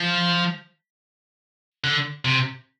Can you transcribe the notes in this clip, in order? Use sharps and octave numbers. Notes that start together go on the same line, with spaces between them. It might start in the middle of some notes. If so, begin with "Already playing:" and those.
Already playing: F3
D3
C3